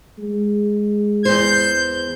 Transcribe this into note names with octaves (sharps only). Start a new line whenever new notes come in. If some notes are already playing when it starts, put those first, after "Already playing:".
G#3
E2 C5 G6